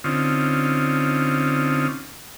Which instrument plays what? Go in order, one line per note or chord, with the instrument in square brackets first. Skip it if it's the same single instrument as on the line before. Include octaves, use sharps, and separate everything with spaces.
[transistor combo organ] D3 C4 C#4 D#4 F4